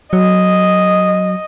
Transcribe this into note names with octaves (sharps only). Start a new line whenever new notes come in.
F#3 D#5